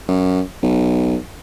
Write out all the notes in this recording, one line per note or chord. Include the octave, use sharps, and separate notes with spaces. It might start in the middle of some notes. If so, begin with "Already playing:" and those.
F#2
B1